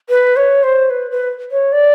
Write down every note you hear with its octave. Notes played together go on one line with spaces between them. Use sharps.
B4
C#5
C5
B4
B4
C#5
D5